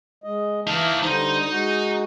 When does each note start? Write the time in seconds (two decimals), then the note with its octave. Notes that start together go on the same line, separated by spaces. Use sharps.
0.24 G#3 D#5
0.67 E3 D#4 F5 A5
1.03 D3 G3 D#4 C5
1.51 G#3 F#4